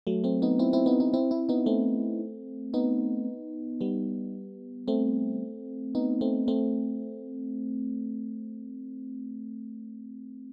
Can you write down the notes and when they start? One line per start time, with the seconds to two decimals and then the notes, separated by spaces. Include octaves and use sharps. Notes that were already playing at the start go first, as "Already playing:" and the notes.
0.07 F#3 A3
0.24 A3 C4
0.42 B3 D#4
0.59 C4 E4
0.73 C4 E4
0.86 B3 D#4
1.00 B3 D#4
1.14 C4 E4
1.31 C4 E4
1.49 B3 D#4
1.66 A3 C4
2.74 B3 D#4
3.81 G3 B3
4.88 A3 C4
5.95 B3 D#4
6.21 A3 C4
6.48 A3 C4